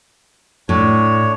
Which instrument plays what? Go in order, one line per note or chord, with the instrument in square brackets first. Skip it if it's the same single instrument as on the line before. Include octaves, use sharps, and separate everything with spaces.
[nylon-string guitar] A2 [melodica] D4 C#5